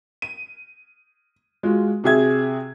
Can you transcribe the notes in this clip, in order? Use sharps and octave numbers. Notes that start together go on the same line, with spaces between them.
D#7
G#3 F4 F#4
C3 F#4 G#4 E5 G#6